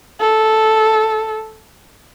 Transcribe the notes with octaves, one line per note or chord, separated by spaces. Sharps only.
A4